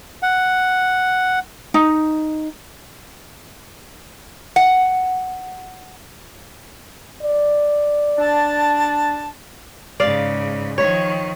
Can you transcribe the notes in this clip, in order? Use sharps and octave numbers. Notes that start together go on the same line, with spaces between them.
F#5
D#4
F#5
D5
D4 A5
G#2 C#3 D5 F5
D#3 F3 C#5